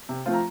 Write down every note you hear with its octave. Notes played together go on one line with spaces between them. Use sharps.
C3
F3 A3 C4 F4
A#5